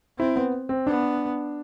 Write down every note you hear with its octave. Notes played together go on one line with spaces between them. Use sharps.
C4 E4
B3
C4
B3 D4